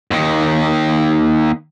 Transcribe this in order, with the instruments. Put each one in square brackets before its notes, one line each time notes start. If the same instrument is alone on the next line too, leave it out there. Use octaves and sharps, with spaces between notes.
[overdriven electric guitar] D#2 D#3